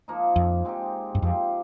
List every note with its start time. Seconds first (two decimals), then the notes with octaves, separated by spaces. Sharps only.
0.08 F3 A#3 D#4
0.36 F2
0.65 G#3 C4 D#4 G4
1.15 G2
1.22 F2 F3 C4 G4 C5